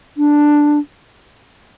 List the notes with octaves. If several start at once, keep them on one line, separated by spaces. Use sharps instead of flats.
D4